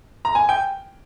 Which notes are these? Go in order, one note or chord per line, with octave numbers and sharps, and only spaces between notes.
A#5
G#5
G5